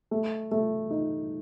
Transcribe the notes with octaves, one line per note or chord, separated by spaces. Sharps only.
A3
A3
D#4